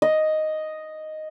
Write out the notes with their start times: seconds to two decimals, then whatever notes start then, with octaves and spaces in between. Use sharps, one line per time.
0.02 D#5